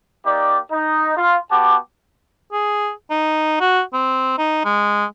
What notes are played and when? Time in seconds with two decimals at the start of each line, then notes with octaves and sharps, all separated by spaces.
0.25 A#3 D#4 G4 D5
0.71 D#4
1.16 F4
1.50 B3 F#4 G4 A5 D6
2.52 G#4
3.10 D#4
3.60 F#4
3.93 C4
4.38 D#4
4.65 G#3